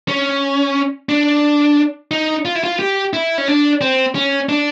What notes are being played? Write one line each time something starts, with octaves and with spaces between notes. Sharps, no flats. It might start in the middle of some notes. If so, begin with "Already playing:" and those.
C#4
D4
D#4
F4
E4
F4
G4
E4
C#4
D4
C4
C#4
D4